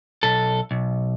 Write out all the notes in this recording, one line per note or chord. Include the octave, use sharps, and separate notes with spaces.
B1 A4
B1